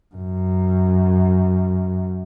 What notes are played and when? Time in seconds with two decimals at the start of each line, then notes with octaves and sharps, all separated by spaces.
0.15 F#2